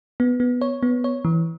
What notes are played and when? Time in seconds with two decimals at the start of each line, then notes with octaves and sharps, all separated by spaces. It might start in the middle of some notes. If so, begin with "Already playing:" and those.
0.20 B3
0.40 B3
0.61 C#5
0.83 B3
1.04 C#5
1.25 E3